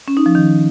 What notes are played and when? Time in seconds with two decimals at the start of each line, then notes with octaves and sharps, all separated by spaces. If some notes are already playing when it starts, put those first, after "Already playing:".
0.08 C#4
0.17 D#4
0.26 F3
0.35 D#3